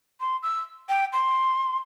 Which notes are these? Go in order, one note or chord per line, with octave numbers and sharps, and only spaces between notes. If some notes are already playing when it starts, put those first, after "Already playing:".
C6
E6
G5
C6